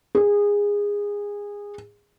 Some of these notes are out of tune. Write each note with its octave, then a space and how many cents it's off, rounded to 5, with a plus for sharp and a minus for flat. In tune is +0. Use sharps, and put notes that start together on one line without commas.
G#4 -20